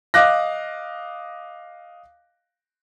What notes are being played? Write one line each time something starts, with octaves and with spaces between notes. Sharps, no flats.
D#5 F5 D6 F#6 A#6